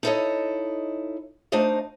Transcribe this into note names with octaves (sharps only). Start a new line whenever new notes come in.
D#4 E4 A4 C5 C#5 D#5
A3 D4 D#4 C5 D#5 F5